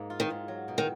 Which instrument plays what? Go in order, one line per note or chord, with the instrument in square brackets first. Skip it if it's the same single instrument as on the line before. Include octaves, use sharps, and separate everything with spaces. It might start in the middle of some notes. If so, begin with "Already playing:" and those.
Already playing: [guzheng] G#2 A#3
F4
[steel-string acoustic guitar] D#3
[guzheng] G#2
F#3
B2
[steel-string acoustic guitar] D#3